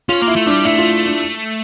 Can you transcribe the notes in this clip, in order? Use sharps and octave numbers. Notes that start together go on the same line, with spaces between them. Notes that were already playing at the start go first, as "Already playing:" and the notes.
C#4 F4
A#3
E4
A3
G3 D4
A3 E4
F4
D4